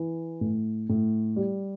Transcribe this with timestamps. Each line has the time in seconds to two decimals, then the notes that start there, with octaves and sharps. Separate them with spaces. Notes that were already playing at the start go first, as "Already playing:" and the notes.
Already playing: E3
0.41 A2
0.89 A2
1.36 G3